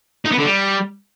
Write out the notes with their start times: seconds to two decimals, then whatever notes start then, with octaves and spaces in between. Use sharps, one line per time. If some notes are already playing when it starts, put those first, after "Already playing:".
0.25 D#4
0.31 B3
0.38 D3
0.44 G3